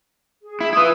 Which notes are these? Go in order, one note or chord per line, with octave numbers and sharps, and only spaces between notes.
G#4
E4
E4 F4 B4 D#6 E6